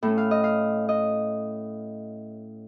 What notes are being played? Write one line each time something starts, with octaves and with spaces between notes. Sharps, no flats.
A2 A3 C#4
F5
D#5
F5
D#5